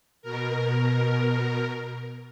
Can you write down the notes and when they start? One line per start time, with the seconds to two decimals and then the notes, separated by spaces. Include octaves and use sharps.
0.22 B2 A#4